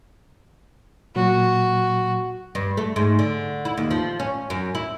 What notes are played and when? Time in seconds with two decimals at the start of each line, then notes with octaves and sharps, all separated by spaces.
1.16 A#2 F#3 F#4
2.55 G2
2.77 A3
2.96 G#2
3.19 D3
3.65 E4
3.77 D#2
3.91 F3
4.20 C#4
4.50 F#2
4.75 E4